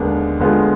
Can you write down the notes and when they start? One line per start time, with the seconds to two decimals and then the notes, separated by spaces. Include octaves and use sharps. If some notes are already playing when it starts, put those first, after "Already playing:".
Already playing: D#2 D3 G#3 B3 D4
0.40 D#2 D3 G#3 B3 F4